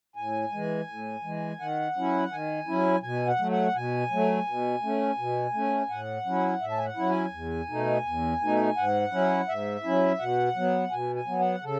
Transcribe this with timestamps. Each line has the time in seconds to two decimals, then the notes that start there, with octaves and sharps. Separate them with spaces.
0.16 A2 G#5
0.52 E3 G#3
0.88 A2
1.24 E3 G#3
1.59 D#3 F#5
1.96 F#3 C#4 E4
2.31 D#3 G#5
2.67 F#3 C#4 E4
3.03 B2 G#5
3.27 F#5
3.39 F#3 A3
3.51 F#5
3.75 B2 G#5
4.11 F#3 A3
4.47 B2
4.83 A3 C#4
5.18 B2
5.54 A3 C#4
5.89 A2 F#5
6.26 F#3 C#4 E4
6.61 A2 E5
6.71 A5
6.78 G#5
6.85 F#5
6.97 F#3 C#4 E4
7.10 G#5
7.33 E2
7.69 B2 A3 D#4
8.05 E2
8.41 B2 A3 D#4
8.77 G#2 F#5
9.12 F#3 C#4 E4
9.48 G#2 E5
9.83 F#3 C#4 E4
10.19 B2 F#5
10.56 F#3 B3
10.91 B2 G#5
11.16 G#5
11.27 F#3 B3
11.39 F#5
11.63 C#3 A4